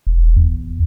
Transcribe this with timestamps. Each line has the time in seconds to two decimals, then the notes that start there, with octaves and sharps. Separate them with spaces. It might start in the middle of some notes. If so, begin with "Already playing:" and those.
0.07 E1
0.36 E2